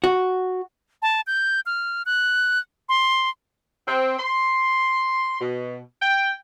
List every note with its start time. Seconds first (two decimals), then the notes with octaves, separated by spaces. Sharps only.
0.04 F#4
1.02 A5
1.27 G6
1.66 F6
2.06 F#6
2.89 C6
3.88 C4
4.19 C6
5.41 B2
6.02 G5